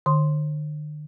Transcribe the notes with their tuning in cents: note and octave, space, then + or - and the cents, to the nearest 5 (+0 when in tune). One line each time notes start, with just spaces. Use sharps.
D3 +45 C6 +0